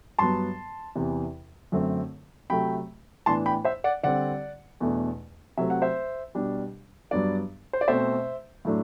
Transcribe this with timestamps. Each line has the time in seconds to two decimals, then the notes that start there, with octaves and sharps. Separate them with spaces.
0.19 G2 F#3 B3 A5 C6
0.96 E2 C3 E3
1.72 F#2 D3 A3 C4
2.50 C3 F#3 A3 G5 B5
3.26 A2 E3 B3 D4 A5 C6
3.46 G5 B5
3.65 C5 E5
3.84 D5 F#5
4.03 D3 G3 C4 D5 F#5
4.80 E2 B2 A3 D4
5.57 C3 F#3 A3 C4 E5
5.70 F#5
5.82 C5 E5
6.35 B2 G3 D4
7.11 G2 F#3 B3 D4 D5
7.73 C5
7.81 D5
7.88 B2 A3 C4 C5 E5
8.65 A2 F#3 A3 D4